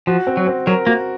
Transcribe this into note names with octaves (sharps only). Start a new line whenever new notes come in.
F3 F#4
C4
F#3
C4
F#3 A#4
A#3 F#4